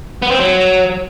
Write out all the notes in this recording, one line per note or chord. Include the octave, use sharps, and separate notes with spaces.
B3
C4
F#3